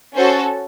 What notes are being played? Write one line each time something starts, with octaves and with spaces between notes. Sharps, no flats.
C#4 F#4 A4 C5